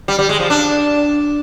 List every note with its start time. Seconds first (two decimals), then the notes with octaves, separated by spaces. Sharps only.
0.08 G3
0.19 G3
0.29 G#3
0.40 F3
0.50 D4